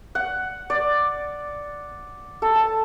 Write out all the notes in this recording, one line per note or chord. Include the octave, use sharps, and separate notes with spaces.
F#5
D5
A4
A5